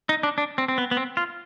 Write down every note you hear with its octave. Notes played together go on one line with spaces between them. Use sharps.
D#4
D4
D4
C4
C4
B3
B3
C4
F4